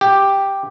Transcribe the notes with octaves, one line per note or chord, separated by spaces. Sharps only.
G4